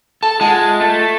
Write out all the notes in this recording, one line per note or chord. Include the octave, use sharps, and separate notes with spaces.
A4 A5
G#3 F4 F#5
A3 A4